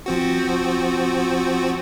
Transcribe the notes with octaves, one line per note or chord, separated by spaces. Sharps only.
F3 C4 F#4